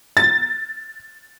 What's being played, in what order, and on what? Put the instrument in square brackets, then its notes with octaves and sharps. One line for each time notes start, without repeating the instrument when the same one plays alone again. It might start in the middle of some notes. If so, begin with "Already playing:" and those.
[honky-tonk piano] A6